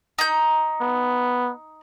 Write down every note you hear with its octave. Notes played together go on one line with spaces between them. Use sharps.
D#4 G6
B3